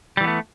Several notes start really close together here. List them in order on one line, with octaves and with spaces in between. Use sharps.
G3 E3 B3 A3